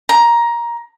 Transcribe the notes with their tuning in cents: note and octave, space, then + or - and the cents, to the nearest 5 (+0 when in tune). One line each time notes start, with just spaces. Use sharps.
A#5 +15